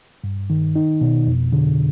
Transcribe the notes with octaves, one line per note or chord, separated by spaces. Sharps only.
G2
D#3
D#4
B2
F2
D3